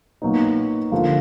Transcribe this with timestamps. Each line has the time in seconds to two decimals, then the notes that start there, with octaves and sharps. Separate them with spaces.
0.22 A#2 F#3 B3 D#4
0.92 D3 F3 A#3